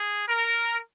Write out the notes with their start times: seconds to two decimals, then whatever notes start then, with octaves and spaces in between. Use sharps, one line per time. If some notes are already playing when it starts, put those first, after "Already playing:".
Already playing: G#4
0.29 A#4